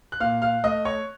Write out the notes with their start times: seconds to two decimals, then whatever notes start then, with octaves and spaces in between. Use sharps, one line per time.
0.12 F#6
0.20 A#2 F5 F6
0.42 F5 F6
0.64 A3 D#5 D#6
0.85 C#5 C#6